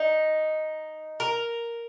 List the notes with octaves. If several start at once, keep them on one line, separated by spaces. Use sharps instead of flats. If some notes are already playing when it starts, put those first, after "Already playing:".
Already playing: D#4
A#4